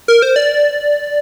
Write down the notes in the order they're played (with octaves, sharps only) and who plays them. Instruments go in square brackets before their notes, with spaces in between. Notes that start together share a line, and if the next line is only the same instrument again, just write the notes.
[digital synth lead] A#4
C5
D5